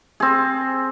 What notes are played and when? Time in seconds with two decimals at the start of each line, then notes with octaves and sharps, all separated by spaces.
0.20 C4 G#4